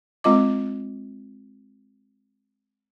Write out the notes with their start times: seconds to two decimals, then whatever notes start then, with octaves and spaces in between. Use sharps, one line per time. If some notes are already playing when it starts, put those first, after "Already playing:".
0.24 G#3 C4 F4 D#5 D6